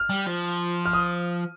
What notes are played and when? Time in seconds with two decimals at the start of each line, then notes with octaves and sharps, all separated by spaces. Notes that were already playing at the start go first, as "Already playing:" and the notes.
Already playing: F6
0.10 G3
0.26 F3
0.86 F6
0.93 D#6